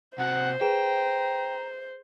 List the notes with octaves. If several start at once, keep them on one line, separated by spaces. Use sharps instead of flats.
C3 F#4 C5 F#5
G#4 B4 G5 A#5 E7